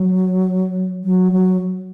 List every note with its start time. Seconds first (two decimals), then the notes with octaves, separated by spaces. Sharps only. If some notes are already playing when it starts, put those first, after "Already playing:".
Already playing: F#3
1.04 F#3
1.32 F#3